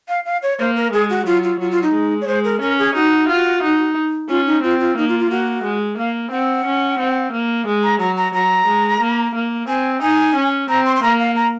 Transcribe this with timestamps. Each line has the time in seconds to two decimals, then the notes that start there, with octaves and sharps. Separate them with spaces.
0.09 F5
0.26 F5
0.43 C#5
0.59 A#3 C5
0.76 A#4
0.92 G#3 G#4
1.10 F#4
1.26 F#3 F4
1.43 F4
1.60 F#3 F4
1.71 F4
1.83 D#4
1.93 G#3
2.21 C#5
2.28 G#3 C5
2.44 A#4
2.61 C#4 A#4
2.79 G#4
2.95 D#4 F#4
3.29 F4
3.63 D#4
4.29 C#4 F4
4.47 D#4
4.63 C4 F4
4.80 F4
4.97 A#3 D#4
5.08 F4
5.19 F4
5.30 A#3 F#4
5.64 G#3
5.98 A#3 F5
6.31 C4 F#5
6.65 C#4
6.99 C4
7.32 A#3
7.67 G#3
7.83 A#5
8.00 F#3 A#5
8.17 A#5
8.34 F#3 A#5
8.67 G#3
9.01 A#3
9.35 A#3
9.68 C4 G#5
10.02 D#4 G#5
10.35 C#4
10.69 C4 A#5
10.86 C6
10.96 C6
11.03 A#3 A#5
11.20 F5
11.36 A#5